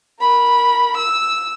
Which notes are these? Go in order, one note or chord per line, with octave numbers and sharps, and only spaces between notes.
A#4 B5
E6